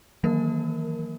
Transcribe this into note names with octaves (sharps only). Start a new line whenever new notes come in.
D#3 E3 F#3 A#3 A#4